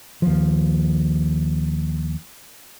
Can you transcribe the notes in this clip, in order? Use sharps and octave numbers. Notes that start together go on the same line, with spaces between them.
D#2 F3